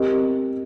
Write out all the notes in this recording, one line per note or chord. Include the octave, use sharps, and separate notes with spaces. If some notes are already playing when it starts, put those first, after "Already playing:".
Already playing: C4 G4 A#4 D#5